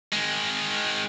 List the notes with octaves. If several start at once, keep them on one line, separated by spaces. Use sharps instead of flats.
D#3 G#3